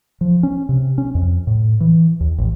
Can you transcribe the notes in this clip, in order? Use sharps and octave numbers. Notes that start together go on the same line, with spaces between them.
F3
C#4
C3
C#4
F2
A2
E3
D#2
A1